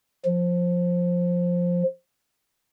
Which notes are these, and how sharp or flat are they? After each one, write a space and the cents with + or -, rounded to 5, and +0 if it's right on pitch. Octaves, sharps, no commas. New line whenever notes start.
F3 +10